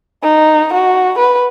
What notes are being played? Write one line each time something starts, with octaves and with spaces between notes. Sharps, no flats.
D#4
F#4
B4